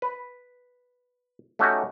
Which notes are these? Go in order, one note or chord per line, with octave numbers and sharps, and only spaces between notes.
B4
A3 C#4 D#4 F#4 G4